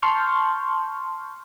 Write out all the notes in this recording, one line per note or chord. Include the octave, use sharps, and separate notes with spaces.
A5 C6 C#6 F6 G6